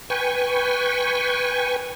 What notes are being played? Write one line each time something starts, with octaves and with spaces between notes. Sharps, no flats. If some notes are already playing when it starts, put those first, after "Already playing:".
B4 G5 G#5 C#6